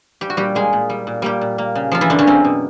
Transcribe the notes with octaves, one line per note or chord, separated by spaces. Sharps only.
G3 G4
F#4
A#2 G3 G4
G#3 A#3 G#4
A#2
G3
A#2
G3 A#3 G4
A#2
A#3
C#3
F3 A#3 F4
E3 E4
F#2 D3 D4
C#3 C#4
A#3 C4
B2